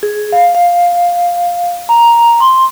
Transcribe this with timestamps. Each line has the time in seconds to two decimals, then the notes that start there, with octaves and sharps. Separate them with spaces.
0.03 G#4
0.32 F5
0.55 F5
1.89 A#5
2.40 C6